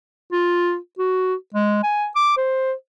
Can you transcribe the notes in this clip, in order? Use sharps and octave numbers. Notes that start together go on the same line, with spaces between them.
F4
F#4
G#3
G#5
D6
C5